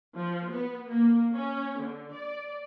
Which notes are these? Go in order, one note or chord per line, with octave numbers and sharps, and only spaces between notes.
F3
B3
A#3
C#4
D3
D5